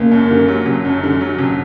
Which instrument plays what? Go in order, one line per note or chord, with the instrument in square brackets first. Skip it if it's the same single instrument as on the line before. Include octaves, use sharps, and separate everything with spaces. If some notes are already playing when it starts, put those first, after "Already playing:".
Already playing: [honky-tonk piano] F#1 [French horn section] A#3
[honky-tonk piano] F#2
D3
F#3
F#1
F#2
D3
F#3
F#1